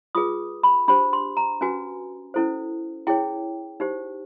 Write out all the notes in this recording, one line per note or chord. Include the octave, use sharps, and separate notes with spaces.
F4 G#4 B4 D#6
B5
D4 G4 C5 B5
C6
A#5
C#4 F#4 B4 G#5
C#4 E4 A4 C5
E4 G#4 C#5 G5
D#4 G4 C5